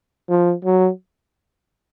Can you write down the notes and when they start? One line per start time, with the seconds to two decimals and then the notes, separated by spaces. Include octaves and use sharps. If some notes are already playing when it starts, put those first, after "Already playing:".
0.29 F3
0.64 F#3